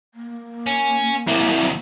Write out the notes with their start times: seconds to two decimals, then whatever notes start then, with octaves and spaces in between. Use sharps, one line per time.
0.14 A#3
0.67 C#4
1.28 D#2 C3 F#3 E4